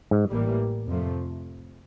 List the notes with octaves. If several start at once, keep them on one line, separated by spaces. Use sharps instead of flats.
G#2
A1 A2 E3 G3 A#3
F2 C3 F3 A3